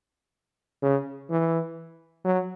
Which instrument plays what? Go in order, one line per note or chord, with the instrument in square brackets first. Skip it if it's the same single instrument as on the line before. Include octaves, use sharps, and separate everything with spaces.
[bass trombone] C#3
E3
F#3